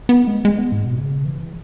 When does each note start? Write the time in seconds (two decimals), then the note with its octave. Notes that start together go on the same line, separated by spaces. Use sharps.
0.09 B3
0.27 G#3
0.45 G#3
0.59 B3
0.72 G#2
0.85 B2
0.99 C#3
1.25 E3